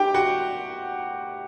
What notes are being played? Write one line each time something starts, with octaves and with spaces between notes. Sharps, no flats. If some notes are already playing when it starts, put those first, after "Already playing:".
Already playing: G4 G5
F#4 F#5